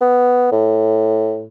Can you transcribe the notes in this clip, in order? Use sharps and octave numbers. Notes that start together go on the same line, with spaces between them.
B3
A2